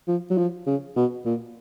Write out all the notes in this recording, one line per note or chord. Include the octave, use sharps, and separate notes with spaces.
F3
F#3
F3
C#3
B2
A#2